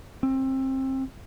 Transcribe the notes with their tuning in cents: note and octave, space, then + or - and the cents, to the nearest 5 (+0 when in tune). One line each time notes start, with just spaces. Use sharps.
C4 +25